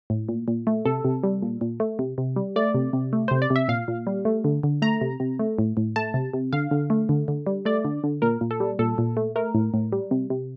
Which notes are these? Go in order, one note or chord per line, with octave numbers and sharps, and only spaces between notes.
A2
A#2
A#2
A3
C3 A4
C3
G3
A#2
A#2
A3
C3
C3
G3
A3 D5
C3
C3
A3
C3 C5
D5
C3
E5
A#2 F5
A#2
G3
A3
D3
D3
A3 A#5
C3
C3
A3
A2
A2
A3 A5
C3
C3
D3 F5
D3
A3
D3
D3
G3
A3 D5
D3
D3
A#2 A#4
A#2
A4
G3
A#2 A4
A#2
A3
A3 A#4
A2
A2
G3
C3
C3